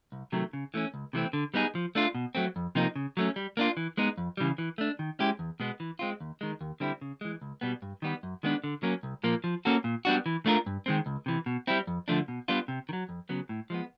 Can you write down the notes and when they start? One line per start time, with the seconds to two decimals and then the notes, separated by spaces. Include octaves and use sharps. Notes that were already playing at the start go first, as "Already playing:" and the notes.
0.12 C2
0.32 C3 D#3 F#3 A3
0.53 C#3
0.74 E3 A3 C#4
0.94 C#2
1.13 C3 E3 A3 C4
1.33 D3
1.54 G3 B3 D#4 G#4
1.75 F3
1.95 A3 D4 F4
2.15 B2
2.35 F#3 A3 C4
2.56 F2
2.75 C3 F3 A#3 D#4
2.96 C#3
3.17 F#3 A3 C#4
3.36 G3
3.57 A#3 D4 F4
3.77 E3
3.97 G#3 B3 D#4
4.18 F2
4.37 C#3 E3 G3
4.58 E3
4.78 A3 D4
4.99 D#3
5.19 G#3 C#4 E4 G4
5.39 E2
5.60 B2 G#3 B3
5.80 E3
5.99 G#3 C4 F4
6.21 D#2
6.41 D#3 G#3
6.61 D#2
6.80 D3 G3 C4 E4
7.01 C#3
7.21 E3 G#3
7.42 C#2
7.61 B2 G3 B3
7.82 G2
8.02 D#3 G3 B3
8.23 F#2
8.43 D#3 G#3 B3 D4
8.64 D3
8.83 F#3 A#3 C#4
9.03 C2
9.23 A#2 F3 A#3
9.44 F3
9.65 A#3 C#4 F#4 A4
9.84 A#2
10.05 G3 B3 D4 F#4
10.26 E3
10.46 A3 D4 F4 A#4
10.66 G2
10.86 D#3 G#3 C4
11.06 C#2
11.26 C3 E3
11.46 B2
11.67 G3 C4 E4
11.87 F2
12.08 D3 F3 A3 D4
12.28 B2
12.48 G3 B3 D4 F4
12.68 C3
12.89 D#3
12.93 F#3
13.09 F2
13.29 C#3 F#3 B3
13.49 A2
13.70 F3 G#3 B3